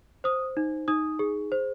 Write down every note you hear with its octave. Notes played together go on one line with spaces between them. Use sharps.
C5 D#6
D#4
D#4 D#6
G#4
C5